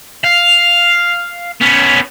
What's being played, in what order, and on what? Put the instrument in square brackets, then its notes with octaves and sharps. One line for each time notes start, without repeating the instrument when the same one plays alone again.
[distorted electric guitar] F5
B3 C#4